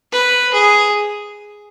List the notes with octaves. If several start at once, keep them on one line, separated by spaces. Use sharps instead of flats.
B4
G#4